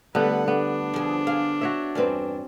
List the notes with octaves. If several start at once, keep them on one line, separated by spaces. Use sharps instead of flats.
D3 G3 A3 B3 B4 F#5
B3 D4
F3 G#4
G#4 F5
F#4 C#5 E5
E2 G2 C4 C#4 B4